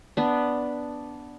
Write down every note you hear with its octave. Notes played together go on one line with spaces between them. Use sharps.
B3 D4